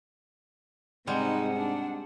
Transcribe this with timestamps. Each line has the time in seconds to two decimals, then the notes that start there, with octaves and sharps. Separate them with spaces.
1.07 G#2 C3 G3 G#3 D#4 F#5
1.56 D4